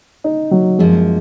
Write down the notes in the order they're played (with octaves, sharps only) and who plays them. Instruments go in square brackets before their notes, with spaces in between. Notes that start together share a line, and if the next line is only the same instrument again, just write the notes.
[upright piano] D#4
F#3
[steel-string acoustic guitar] F#2 F3 A#3 [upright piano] G#3